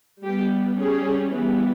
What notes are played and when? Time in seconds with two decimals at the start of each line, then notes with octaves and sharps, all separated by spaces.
0.24 G3 B3 G4
0.79 G3 C#4 G#4
1.33 E3 G3 B3